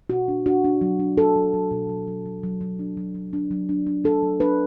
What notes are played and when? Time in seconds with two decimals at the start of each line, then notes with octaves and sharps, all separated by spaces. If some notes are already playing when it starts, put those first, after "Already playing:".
0.10 B2 F#4
0.28 D4
0.46 D4 F#4
0.64 D4
0.81 F#3
1.00 D4
1.17 D4 A4
1.36 F#3
1.54 F#3
1.71 B2
1.89 F#3
2.07 F#3
2.26 F#3
2.43 F#3
2.61 F#3
2.79 D4
2.97 F#3
3.15 F#3
3.33 D4
3.51 F#3
3.69 D4
3.87 D4
4.04 D4 A4
4.23 F#3
4.40 D4 B4